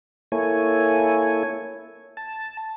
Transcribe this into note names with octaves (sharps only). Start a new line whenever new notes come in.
A#3 E4 A4 C#5 G#5
A5